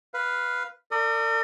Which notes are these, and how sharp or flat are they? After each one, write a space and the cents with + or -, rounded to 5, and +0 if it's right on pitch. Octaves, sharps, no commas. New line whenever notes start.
B4 +0 F5 +0
A#4 -45 D5 +5 D#6 +0